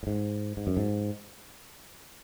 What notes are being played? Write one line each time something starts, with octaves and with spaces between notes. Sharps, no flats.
A2
G#2
G#2
F#2
G#2